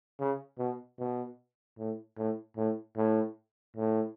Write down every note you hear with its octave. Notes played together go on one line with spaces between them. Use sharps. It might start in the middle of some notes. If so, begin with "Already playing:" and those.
C#3
B2
B2
A2
A2
A2
A2
A2